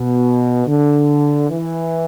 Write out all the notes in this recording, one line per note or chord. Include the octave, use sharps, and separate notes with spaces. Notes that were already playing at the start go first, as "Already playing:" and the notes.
Already playing: B2
D3
E3